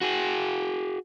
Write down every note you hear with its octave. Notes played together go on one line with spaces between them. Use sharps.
F#4 G#4